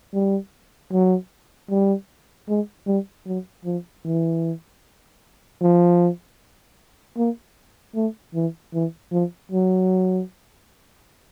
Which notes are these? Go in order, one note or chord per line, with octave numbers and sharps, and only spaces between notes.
G3
F#3
G3
G#3
G3
F#3
F3
E3
F3
A#3
A3
E3
E3
F3
F#3